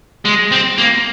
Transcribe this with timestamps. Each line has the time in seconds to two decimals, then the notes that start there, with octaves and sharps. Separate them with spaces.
0.25 G#3
0.52 C4
0.78 A#3